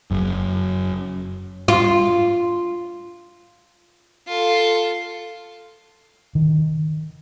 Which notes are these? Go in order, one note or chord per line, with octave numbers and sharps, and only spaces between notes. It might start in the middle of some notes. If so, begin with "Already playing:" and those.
F#1 F#2
F4
F4 A4
D#3